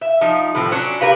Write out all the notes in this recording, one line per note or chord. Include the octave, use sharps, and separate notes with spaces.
E5
F3 D#4
A2 D#3 F3 C4
F#3 C#4 D4
G4 A#4 B4 F5